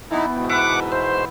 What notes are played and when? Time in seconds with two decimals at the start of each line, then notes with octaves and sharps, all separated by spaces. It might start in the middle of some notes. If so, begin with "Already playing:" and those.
0.11 E3 B3 D#4 E4
0.36 G#2 B2 G5
0.50 B4 E5 F#5 D6
0.92 C5